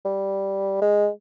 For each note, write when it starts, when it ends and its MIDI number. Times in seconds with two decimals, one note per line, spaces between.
0.05 0.80 55
0.81 1.09 56